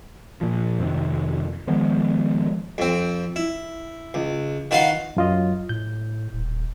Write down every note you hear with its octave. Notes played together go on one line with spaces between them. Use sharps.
A#2 F3
F2 C3 D#3
D#3 F3 G#3 B3
F2 C4
E4
C#2
D#3 F4 F#4 B4 F5 C6
F#2 F#3 F4 D#5
A2 G6
D#1